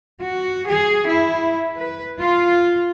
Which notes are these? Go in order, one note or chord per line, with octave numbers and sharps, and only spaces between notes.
F#4
G#4
E4
B4
F4